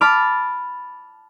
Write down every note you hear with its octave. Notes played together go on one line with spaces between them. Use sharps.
A5 B5 D6 F6